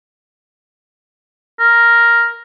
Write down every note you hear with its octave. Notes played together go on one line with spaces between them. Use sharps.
A#4